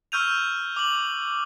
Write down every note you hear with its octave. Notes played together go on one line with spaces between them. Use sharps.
C#6 E6 F6 G6 D#7 F7
D6 F#7